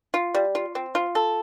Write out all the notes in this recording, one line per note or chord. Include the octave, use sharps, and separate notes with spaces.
F4
G3
F4
C4
F4
A4